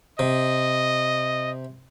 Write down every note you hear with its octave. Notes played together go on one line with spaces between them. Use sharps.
C3 D#5